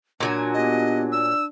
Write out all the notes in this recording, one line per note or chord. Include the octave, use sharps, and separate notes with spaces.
A#2 F#3 D4 G#5
B3 G4 D#5
D5 E6